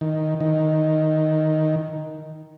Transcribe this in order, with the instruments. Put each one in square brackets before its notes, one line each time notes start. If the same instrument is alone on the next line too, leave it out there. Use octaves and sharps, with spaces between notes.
[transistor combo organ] D#3
D#3